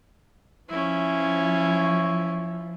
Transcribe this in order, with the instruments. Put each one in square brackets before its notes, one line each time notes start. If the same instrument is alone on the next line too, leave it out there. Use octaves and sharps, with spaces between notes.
[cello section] F3 [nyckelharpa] C#4 E4